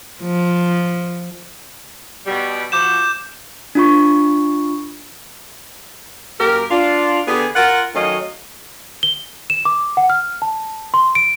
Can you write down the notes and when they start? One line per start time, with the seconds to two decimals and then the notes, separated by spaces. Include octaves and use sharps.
0.23 F3
2.26 B2 G3
2.72 F3 F#4 D6 G6 E7
3.75 D4 F4 C#6
6.39 F#2 A#3 G4 A#4
6.71 D4 F4
7.28 D3 B3 G4 G#4
7.55 F4 A#4 F#5
7.94 D#3 F#3 A3 C#4 D#5 F5
9.03 G7
9.50 E7
9.65 D6
9.97 F#5
10.10 F6
10.42 A5
10.94 C6
11.15 D7